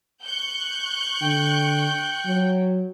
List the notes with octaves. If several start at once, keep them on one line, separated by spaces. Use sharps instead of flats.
C#6 F#6 G6
D3 G5
F#3